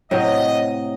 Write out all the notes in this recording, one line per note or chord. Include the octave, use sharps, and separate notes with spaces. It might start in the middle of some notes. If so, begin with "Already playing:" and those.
A2 C3 F#3 D#5